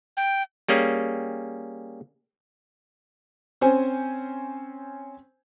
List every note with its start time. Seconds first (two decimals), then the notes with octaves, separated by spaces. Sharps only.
0.17 G5
0.69 G3 A#3 C#4 G#4
3.61 C4 C#4 C5 G#5